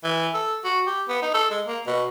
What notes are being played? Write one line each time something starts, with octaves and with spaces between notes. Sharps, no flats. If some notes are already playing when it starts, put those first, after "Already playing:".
E3
A4
F#4
G4
B3
D#4
A4
G#3
A#3
B2